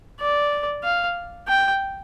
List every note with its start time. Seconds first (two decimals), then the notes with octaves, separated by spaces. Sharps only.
0.20 D5
0.83 F5
1.48 G5